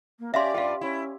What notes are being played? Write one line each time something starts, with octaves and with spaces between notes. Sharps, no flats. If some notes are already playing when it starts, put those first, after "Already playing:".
A#3
C#4 G4 D5 E5 F5 C6
G2 F4 G4 F5
C#4 E4